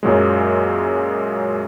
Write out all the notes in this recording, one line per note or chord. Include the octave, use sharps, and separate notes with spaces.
F#2 A#2 F#3 G#3